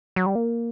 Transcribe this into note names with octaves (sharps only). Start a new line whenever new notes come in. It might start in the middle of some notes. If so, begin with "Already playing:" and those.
F#3
G3
A#3